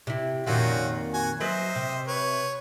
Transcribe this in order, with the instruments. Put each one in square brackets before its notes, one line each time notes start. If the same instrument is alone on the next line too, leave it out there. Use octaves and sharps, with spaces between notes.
[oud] C3 E4
[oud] F2 A#2 D#3 [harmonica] C#4 F4 F#4
[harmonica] F#4 F#5 G#5
[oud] F#3 B4 [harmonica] C5 D#5 E5
[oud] C3
[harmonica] B4 C#5